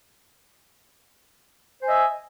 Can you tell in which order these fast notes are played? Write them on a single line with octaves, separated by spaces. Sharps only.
C5 G#5 D#5 E5